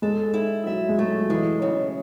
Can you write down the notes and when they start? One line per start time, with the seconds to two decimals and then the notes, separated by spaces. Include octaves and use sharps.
0.02 G#3 A4
0.34 E4
0.66 F#3 E5
0.89 G#3
0.98 F#3 A3
1.23 F#3
1.29 E3 G#3
1.62 C#3